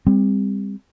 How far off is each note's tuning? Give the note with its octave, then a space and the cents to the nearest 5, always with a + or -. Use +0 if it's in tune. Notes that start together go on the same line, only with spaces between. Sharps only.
G3 +30 C4 +0